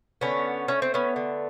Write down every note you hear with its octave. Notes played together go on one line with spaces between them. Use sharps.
D3 B3 C#4
A3 C#4
C4
B3 C#4
D3